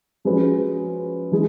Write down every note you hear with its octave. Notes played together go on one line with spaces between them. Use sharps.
F3 G#3 C#4 F#4 B4
E3 G#3